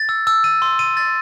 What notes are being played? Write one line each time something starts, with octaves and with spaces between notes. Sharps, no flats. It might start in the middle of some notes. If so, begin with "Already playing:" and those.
Already playing: A6
E6
E6
D#7
C6
D#7
A6